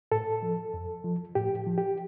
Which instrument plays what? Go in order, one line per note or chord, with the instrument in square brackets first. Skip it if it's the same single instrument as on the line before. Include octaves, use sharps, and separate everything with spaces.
[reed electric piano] A2 A4
F3
F2
F3
A2 G4
F3
G4